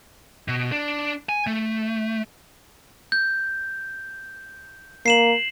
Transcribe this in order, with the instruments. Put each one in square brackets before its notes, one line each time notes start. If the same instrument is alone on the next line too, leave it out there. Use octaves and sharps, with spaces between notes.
[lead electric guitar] B2
D4
G#5
A3
[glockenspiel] G6
[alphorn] A#3 [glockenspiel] C7 E7 F#7